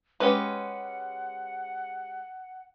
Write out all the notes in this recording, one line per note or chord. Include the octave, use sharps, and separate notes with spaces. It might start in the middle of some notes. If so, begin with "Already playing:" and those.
G#3 C#4 G4 B4 F#5